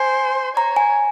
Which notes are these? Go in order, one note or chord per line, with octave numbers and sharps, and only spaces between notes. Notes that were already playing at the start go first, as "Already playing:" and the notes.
Already playing: C5 G#5
C#5 A#5
G#5